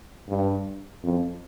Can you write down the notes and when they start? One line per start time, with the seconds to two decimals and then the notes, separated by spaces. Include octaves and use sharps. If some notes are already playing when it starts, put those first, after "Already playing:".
0.28 G2
1.03 F2